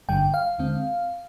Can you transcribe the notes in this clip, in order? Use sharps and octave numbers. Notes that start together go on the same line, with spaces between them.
G#1 G2 D3 G3 G5
F5
D#2 D3 G#3 C4